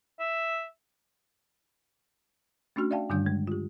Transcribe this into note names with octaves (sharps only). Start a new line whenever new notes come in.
E5
A3 C#4 D4 F#4 F6
D5 E5 F5 G5 A5
G2 D3 D#3 G3 D4 G6
G#3
F4 G4